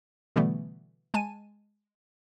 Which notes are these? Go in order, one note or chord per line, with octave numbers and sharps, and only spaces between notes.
B2 D3 E3 G3 A3 B3
G#3 G#5 A5 D#7